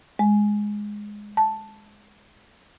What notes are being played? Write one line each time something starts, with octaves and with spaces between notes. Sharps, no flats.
G#3
A5